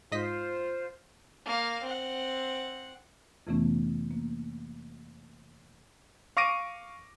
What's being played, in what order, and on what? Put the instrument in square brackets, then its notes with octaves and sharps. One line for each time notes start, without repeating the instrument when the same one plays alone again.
[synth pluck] G#2 D#5 B6 [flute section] F4 C5
[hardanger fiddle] A#3 F5
C4 F#5
[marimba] F2 C3 E3 A3 B3 C#4
A#3
[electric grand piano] F5 C#6 D6 A#6 D7 D#7